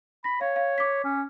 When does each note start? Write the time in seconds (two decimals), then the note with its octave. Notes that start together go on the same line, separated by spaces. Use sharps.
0.24 B5 A#6
0.41 C#5 F5
0.56 F5
0.78 D6 B6
1.04 C#4